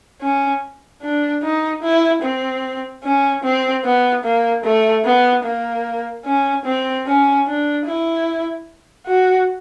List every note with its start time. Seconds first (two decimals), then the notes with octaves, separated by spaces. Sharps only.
0.21 C#4
1.02 D4
1.43 D#4
1.83 E4
2.22 C4
3.04 C#4
3.43 C4
3.84 B3
4.24 A#3
4.64 A3
5.05 B3
5.44 A#3
6.25 C#4
6.65 C4
7.06 C#4
7.47 D4
7.86 E4
9.06 F#4